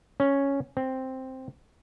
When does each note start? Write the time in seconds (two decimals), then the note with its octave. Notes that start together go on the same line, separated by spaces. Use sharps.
0.20 C#4
0.77 C4